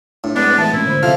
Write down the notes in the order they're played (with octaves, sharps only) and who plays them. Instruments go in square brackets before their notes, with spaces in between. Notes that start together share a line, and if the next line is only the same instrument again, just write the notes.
[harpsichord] A2 [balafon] D4
[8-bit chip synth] G#3 B3 [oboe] D4 [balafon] D5
[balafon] E3 A3 E5 [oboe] A5
[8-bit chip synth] A#2 [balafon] G#3 C#4 [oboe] E4
[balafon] D3 C5 B5
[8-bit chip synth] C3 F6 [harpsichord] F3 [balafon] A4 E5 F5